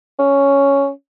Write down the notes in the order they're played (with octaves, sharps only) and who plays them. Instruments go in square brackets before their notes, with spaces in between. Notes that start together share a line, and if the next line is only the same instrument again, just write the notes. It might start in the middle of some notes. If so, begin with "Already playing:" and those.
[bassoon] C#4